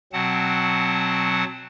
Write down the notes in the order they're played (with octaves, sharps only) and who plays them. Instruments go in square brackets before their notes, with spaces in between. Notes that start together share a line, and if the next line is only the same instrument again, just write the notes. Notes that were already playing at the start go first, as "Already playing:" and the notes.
[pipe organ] B2 F#3 C4 F#5 A5